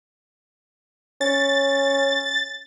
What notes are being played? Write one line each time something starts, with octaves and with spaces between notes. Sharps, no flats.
C#4 A6